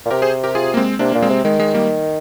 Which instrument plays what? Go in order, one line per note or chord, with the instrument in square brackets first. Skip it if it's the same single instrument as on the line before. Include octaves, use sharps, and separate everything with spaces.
[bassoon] A#2
[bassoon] C3 [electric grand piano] G4 A#4
[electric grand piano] G#4 C5
G4 A#4
F4 G#4
A#3
G#3 C4
[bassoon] C3 [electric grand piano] A#3 D4
[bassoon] A#2 [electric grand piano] A#3
[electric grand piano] G#3 C4
[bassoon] C3
[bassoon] D#3 [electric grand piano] G#3
[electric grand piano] G#3
G3 A#3